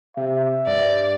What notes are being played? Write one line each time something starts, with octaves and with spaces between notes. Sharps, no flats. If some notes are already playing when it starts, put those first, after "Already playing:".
C3 E5
G2 D5